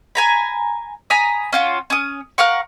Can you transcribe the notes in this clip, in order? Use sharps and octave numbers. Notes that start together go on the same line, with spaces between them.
G#5 A#5 B5
G#5 A#5 B5 D#6
C#4 F4 F#4
C#4 D#6
A#4 F5 F#5 C#6